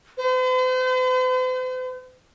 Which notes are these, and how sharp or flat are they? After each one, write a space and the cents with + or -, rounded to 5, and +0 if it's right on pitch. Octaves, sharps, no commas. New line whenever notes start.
C5 -45